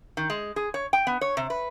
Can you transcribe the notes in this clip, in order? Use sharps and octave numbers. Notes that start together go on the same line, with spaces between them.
D#3
G#3
G#4
C#5
G5
B3
C#5
C3
B4